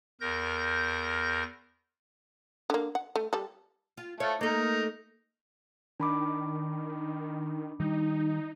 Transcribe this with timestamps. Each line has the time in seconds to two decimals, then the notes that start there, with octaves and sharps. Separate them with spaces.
0.21 E2 A#4 G6 A#6
2.70 D3 A#3
2.95 F#5
3.16 A3
3.33 G3 A4
3.97 F4
4.20 A3 F4 C#5
4.41 A3 A#3 D#4 A#4
6.00 D#3 D4 B5 D6
7.80 D#3 G3 D#4